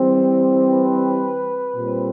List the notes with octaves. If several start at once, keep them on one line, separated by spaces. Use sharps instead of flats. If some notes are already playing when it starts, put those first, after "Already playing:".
Already playing: E3 G3 C4
B4
A#2 G3 C4